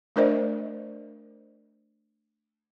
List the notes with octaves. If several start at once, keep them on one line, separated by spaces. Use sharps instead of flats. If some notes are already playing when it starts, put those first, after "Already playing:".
A3 D4 A#4 C5 D5 D#5